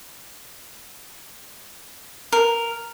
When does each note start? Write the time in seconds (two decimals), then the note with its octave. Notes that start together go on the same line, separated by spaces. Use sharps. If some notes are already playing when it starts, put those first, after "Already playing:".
2.32 A#4